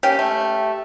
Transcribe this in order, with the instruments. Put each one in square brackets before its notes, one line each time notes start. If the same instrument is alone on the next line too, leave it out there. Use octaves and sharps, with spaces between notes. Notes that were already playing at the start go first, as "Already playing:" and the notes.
[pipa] A#3 C#4 [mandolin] G4
[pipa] A3